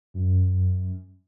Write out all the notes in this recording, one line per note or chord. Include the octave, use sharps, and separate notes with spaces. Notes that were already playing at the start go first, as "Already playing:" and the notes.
F#2